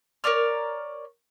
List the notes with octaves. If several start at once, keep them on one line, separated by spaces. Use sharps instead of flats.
A#4 C#5 D5 F6